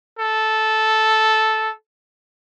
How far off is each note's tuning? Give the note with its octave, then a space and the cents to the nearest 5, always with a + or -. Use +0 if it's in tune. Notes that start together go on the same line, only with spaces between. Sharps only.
A4 -10